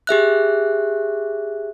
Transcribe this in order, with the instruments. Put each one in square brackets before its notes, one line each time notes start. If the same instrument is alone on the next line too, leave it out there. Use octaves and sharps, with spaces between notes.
[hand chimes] G4 G#4 E5 F#6